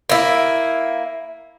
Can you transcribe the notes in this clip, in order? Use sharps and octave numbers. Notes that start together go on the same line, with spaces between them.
A#3 E4